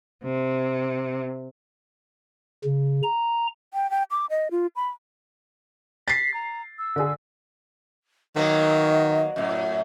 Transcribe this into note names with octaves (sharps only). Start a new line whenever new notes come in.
C3
C#3
A#5
G5
G5
D6
D#5
F4
B5
A6 B6 C7
A#5
E6
D3 G#4
D#3 F#3 A#3 B3 D#5
F#2 A2